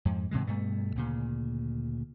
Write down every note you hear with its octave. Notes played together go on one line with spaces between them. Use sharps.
F2 G#2
G#2 C3 E3 G#3
G2 B2 A3
D2 A#2 C#3